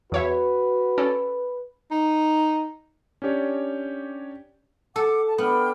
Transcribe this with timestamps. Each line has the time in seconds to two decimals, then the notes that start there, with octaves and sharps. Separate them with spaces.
0.12 E2 F#4 B4 C#5 E5
0.98 C#4 A4 D5
1.91 D#4
3.22 C#4 D4 G4 C#5 D5
4.96 A4 F#5 D6
5.26 A5
5.38 B3 D4 G5 F6